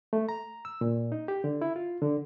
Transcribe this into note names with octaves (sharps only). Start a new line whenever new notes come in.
A3
A#5
E6
A#2
D#4
G4
D3
E4
F4
D3